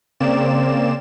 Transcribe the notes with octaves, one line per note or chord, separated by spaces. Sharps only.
C#3 A#3 C4 D5 E7